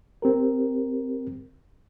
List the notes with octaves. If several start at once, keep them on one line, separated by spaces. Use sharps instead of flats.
C4 G4 A#4